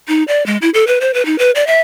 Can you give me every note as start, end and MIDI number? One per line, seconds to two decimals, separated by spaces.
0.08 0.23 63
0.28 0.45 74
0.46 0.57 56
0.62 0.70 64
0.74 0.84 69
0.87 0.99 71
1.01 1.12 72
1.14 1.24 71
1.26 1.38 63
1.39 1.51 71
1.55 1.66 74
1.67 1.81 76